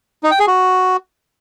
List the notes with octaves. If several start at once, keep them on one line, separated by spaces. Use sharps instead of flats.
D#4
G5
G#4
F#4